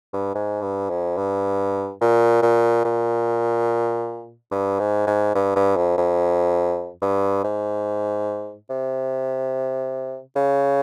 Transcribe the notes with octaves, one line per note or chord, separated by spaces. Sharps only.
G2
G#2
G2
F2
G2
A#2
A#2
A#2
G2
G#2
G#2
G2
G2
F2
F2
G2
G#2
C3
C#3